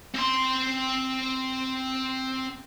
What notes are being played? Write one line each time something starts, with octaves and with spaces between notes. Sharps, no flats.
C4 C6